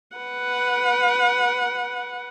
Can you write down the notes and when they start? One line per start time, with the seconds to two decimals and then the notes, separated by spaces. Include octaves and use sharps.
0.17 B4 F#5